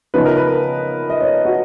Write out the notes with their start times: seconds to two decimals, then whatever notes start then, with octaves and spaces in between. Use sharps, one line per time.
0.14 C#3 F3 B3 D#4 B4
0.25 A#4
0.37 B4
1.10 D#5
1.21 C#5
1.45 F#4